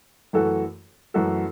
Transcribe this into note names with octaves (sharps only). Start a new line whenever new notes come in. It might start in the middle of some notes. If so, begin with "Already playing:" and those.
F#2 E3 A3 F#4 A4
F#2 E3 A3 F#4 A4